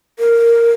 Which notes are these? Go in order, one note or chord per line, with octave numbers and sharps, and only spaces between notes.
A#4